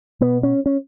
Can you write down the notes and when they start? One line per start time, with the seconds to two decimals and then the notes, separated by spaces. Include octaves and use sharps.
0.21 B2 B3
0.43 C#4
0.66 C#4